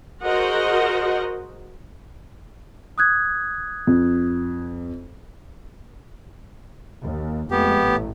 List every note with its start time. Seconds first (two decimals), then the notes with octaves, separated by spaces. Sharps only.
0.23 F#4 G#4 A#4 C5 D#5 F#5
2.98 D#6 F#6 G#6
3.87 F2
7.02 D#2
7.51 F2 G#3 A3 B3 G4
7.82 A1 A2